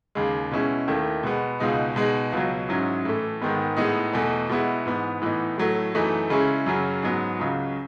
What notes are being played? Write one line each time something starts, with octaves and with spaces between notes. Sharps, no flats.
D#2 C#3 G#3
B2 G#3 C#4 E4
D#2 D#3 A3 E4
B2 G#3 B3
C#2 B2 G#3 D#4
B2 G#3 D#4
C#2 B2 F#3
G#2 F#3 C#4 E4
A2 E3 A3
G#2 D#3 G#3 B3
A2 G#3 B3 D#4
E2 B2 A3
B2 G#3 B3 E4
G#2 E3 B3
A2 E3 B3 D#4
A2 F#3 A3
F#2 E3 A3 D#4
C#3 G#3 C#4 E4
F#2 C#3 F#3 C#4
G#2 F#3 B3
C#2 C#3 F#3 C#4